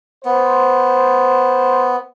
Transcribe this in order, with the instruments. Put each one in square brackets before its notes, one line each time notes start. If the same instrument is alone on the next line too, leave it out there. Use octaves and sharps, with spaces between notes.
[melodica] B3 [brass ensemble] C5